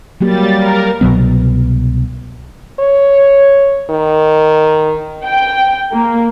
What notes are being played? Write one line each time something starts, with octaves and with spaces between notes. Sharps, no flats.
F#3 G3 A#3 G4 A6
A#4
C2 B2 F#3 B3
C#5
D#3
G5
A#3